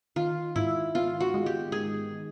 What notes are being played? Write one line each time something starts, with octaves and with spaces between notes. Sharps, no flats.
D#3 F4
G#2 E4
B3 F4
F#4
G#3
G4
D#3 G#4